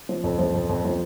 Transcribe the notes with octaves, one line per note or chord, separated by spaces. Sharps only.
F3
F2
F3
F2
F2
F3